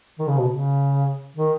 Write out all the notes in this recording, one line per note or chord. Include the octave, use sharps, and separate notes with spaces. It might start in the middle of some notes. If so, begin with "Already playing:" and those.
D#3
C#3
B2
C#3
D#3